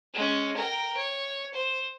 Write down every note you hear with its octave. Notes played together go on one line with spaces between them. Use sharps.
G#3 C#4
A#4 G5
C#5
C5